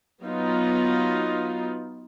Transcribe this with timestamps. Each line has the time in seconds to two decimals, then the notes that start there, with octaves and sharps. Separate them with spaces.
0.22 F#3 B3 D#4 F4